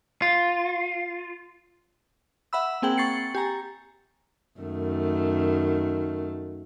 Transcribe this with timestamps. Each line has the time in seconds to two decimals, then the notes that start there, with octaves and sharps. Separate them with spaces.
0.22 F4
2.53 E5 F#5 B5 E6
2.82 A#3 C4 G#4 G5 F#7
2.98 C#6 A6 C7 C#7
3.35 G4 G#5 A#5
4.60 F#2 D#3 A3